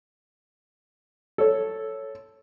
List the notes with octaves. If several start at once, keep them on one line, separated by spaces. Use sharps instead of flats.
A4 C#5